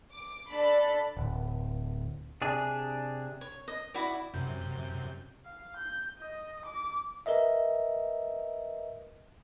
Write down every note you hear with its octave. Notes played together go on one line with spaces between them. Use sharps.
D6
D4 A4 D5 B5
D1
C3 D4 G#4
C#5
D#5
E4 F#4 D5
F#2 C3 G6
F5
G6
D#5
D6
A#4 B4 D#5 E5